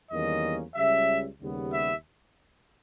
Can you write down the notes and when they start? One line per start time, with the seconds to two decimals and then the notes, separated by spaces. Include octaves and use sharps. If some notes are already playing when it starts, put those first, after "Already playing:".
0.11 E2 D#3 G3 A#3 C#4 D#5
0.75 C#2 C#3 G3 E5
1.41 D#2 C#3 G3 B3
1.72 E5